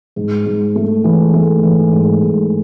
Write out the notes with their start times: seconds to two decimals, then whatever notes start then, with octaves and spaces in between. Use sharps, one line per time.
0.16 G#2
0.46 G#2
0.75 A3
1.04 E3
1.33 A3
1.63 E3
1.92 G#2
2.22 G#2